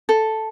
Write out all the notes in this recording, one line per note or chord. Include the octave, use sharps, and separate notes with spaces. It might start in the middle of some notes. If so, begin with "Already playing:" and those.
A4